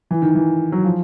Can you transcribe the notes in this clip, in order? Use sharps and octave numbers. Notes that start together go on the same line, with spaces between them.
E3
D#3
E3
F#3
F3